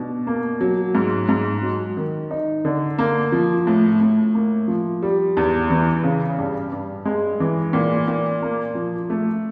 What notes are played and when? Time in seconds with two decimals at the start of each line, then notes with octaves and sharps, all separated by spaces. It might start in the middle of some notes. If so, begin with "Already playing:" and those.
Already playing: B2 D4
0.27 A#3
0.61 F#3
0.95 G#2
1.29 G#2
1.62 F#3
1.97 D#3
2.31 D#4
2.65 D3
2.98 A#3
3.32 F3
3.67 A2
4.01 A2
4.34 A#3
4.68 F3
5.02 G3
5.37 E2
5.70 E3
6.04 C#3
6.38 G2
6.72 G2
7.05 G#3
7.40 E3
7.73 A#2
8.08 A#2
8.42 A#3
8.75 F3
9.10 A3